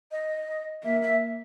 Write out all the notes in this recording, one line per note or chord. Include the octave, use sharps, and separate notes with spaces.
D#5
A#3 E5
E5